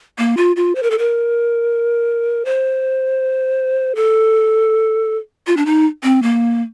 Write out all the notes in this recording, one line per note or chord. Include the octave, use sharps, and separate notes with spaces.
A#3
F4
F4
C5
A#4
A4
A#4
C5
A4
F4
D4
D#4
C4
A#3